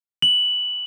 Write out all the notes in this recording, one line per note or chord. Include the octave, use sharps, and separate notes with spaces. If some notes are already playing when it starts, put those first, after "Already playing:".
F#7